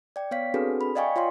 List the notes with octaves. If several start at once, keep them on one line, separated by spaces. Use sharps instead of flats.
D5 G5
B3 C#5 F5 B6
C4 D4 F#4 G#4 A4 B4
B5
D5 D#5 F5 G5 G#5 C#6
F4 C#5 F5 C6